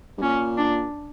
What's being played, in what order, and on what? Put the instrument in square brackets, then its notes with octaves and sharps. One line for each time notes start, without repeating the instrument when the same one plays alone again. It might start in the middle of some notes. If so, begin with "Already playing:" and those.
[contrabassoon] G2
[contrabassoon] A#2 [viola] C#4
[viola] D4